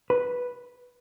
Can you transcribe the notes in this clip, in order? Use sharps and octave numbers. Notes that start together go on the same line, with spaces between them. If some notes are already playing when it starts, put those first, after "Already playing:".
B4